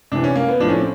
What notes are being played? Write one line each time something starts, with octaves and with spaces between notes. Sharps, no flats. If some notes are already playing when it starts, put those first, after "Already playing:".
C3 E3 D4
C#4
A#3
B3
A2 F3 D4
C#4
C4